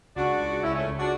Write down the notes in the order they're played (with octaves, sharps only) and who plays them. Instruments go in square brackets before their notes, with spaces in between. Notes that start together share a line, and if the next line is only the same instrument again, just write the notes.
[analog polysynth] C#2 [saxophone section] D4 F#4
[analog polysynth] C#2
[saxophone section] F#4
[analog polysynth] C#2 [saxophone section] C#4 E4
[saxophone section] A3 C#4
[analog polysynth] C#2
[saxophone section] D4 F#4